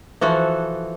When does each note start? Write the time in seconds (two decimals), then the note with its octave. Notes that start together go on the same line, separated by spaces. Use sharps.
0.21 E3 F3 F#4 A4